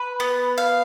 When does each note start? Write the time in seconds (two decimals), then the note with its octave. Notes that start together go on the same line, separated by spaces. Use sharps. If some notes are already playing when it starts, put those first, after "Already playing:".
Already playing: B4
0.20 B3
0.58 F5